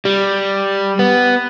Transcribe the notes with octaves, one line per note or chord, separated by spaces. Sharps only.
G3
B3